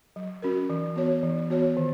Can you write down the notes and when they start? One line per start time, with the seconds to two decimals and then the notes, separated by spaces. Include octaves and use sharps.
0.16 F#3
0.42 C#4 F#4 A#4
0.70 E3
0.96 B3 F#4 C#5
1.23 E3
1.50 B3 F#4 C#5
1.77 D#3